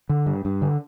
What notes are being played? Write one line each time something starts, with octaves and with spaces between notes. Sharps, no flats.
D3
G2
G2
D3